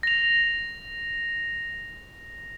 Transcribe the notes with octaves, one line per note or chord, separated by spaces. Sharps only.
A#6 F7